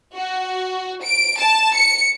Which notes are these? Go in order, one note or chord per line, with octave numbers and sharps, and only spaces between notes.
F#4
D7
A5
C#7